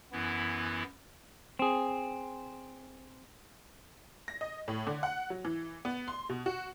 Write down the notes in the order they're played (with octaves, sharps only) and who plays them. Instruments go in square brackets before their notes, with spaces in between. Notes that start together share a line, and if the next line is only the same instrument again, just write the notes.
[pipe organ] F#2 E3 B3 E4
[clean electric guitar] C4 G#4
[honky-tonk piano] A#6
D#5
A2
D3
F#5
F#3
E3
B3
C6
B2
F#4